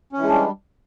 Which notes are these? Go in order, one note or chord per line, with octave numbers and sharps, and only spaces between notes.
E3 G3 G#3 C#4 D4